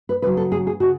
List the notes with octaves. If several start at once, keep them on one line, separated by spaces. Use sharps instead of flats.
B4
C#3 F#3 B4
A4
G#4
G#4
C#3 F#4